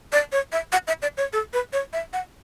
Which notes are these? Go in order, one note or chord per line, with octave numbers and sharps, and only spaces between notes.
D5
C#5
E5
F#5
E5
D5
C#5
A4
B4
C#5
E5
F#5